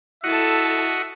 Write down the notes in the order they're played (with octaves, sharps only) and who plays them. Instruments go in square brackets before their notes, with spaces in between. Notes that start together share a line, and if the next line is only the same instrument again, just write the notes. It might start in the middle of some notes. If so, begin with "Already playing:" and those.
[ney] E4 [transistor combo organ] F#4 D#5 F#5 [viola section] A4 A5 [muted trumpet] E5